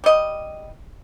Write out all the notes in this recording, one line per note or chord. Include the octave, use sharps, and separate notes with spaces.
G3 D#5